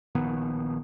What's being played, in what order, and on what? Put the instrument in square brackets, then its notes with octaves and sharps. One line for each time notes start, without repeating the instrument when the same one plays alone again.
[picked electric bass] A#1 D#3 B3